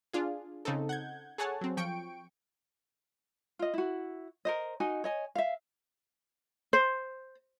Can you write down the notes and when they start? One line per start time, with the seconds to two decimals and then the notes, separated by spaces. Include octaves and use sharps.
0.13 D4 F4 G#4
0.65 C#3 C4 D#4 A4
0.89 F#5 G6 G#6
1.38 G#4 A4 C#5 F#5 G#5 A5
1.61 F#3 C4
1.77 F3 G5 C#6 D7
3.59 F4 D#5
3.74 E4 F#4
4.45 A#4 C5 D#5
4.80 D#4 F#4 D#5 G#5
5.04 C#5 D#5 G#5
5.35 E5 F5
6.73 C5